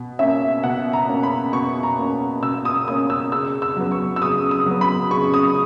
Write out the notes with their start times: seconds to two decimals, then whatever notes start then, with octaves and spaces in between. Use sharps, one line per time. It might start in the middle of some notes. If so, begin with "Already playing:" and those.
Already playing: B2
0.19 A#3 C#4 E5
0.64 B2 F#5
0.93 A#5
1.08 A#3 C#4
1.23 B5
1.53 B2 C#6
1.83 A#5
1.98 A#3 C#4
2.42 B2 E6
2.65 D#6
2.87 A#3 C#4 D#6
3.10 E6
3.32 C#3 E6
3.62 E6
3.77 F#3 B3
3.92 C#6
4.16 E6
4.22 C#3 D#6
4.51 D#6
4.66 F#3 B3
4.81 B5
5.11 C#3 C#6
5.34 D#6